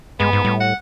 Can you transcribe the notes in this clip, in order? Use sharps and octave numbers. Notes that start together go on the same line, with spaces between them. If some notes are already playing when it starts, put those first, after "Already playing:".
G2 G#3 B3
G#2
A2 G3
F#5